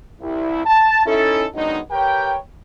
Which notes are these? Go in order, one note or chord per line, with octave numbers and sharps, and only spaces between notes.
C2 E4
A5
C#4 D#4 E4 A4
D#3 F#3 G#3 B3 D4 D#4
G4 A#4 B4 C#5 G5